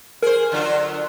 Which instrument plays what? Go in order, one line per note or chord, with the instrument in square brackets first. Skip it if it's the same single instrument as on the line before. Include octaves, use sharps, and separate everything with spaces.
[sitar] G#4 C5 [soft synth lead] A#4
[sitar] D3 F#3 F4